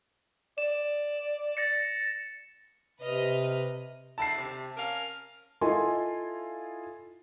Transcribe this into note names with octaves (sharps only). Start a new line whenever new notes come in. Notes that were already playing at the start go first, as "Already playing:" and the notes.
D5 E7
A6 A#6 C#7
C3 B4 D#5 F6
D3 D#3 E4 A5 C7
C3
C#4 A#4 F5
E4 F4 A4 D#5 G#5 C6